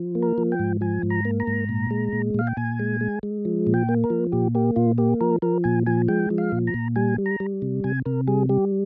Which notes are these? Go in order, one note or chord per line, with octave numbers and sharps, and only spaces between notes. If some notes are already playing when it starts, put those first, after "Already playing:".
Already playing: F3
A#3
A#4
F3
G5
G#2
F3 G#5
G#2
A#5
A#3
A#5
G#2
A#2
G#3
A#2
A#2 F5
G5
A#2 G#5
G#3
G#3
G#3
F3
A#2
G5
A#3
A#4
F3
A#2 G4
A#3 G4
A#2 F4
A#3 G4
F3 A#4
F3 A#4
A#2 G#5
F3 G#5
G#3 G5
F3
F5
A#2
A#5
A#2
G3 G#5
G3
A#5
G3
C3
C3 G#5
C3 A#4
G3 G#4
G3 G4